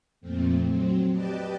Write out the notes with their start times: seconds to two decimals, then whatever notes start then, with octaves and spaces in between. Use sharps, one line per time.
0.21 F2 A#2 A3 C4
0.67 F#3 C4
1.12 G4 B4 D5 D#5 G5 A5